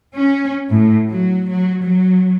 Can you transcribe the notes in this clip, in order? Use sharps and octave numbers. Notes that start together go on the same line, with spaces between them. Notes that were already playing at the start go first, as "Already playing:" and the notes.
C#4
A2
F#3
F#3
F#3